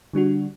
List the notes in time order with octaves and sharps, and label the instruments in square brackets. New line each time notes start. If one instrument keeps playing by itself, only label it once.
[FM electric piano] D3 G3 D4 F#4